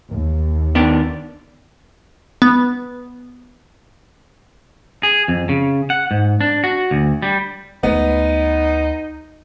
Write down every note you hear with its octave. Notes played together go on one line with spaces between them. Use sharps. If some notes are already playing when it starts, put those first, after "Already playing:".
D#2
D#3 B3 D4
B3
G#4
F2
C#3
F#5
G#2
D4
F#4
D2
G3
D2 G#3 B3 D#4